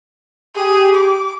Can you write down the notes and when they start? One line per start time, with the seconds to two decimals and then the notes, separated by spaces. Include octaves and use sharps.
0.56 G4 G#4
0.95 D6